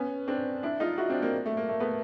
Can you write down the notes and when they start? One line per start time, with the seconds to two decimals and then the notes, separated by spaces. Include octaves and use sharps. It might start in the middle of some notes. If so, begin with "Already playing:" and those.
Already playing: B3 C#4
0.28 C4 D4
0.63 D4 E4
0.80 D#4 F4
0.98 E4 F#4
1.10 C4 D4
1.22 A#3 C4
1.46 A3
1.57 A#3
1.69 A3
1.80 A3 B3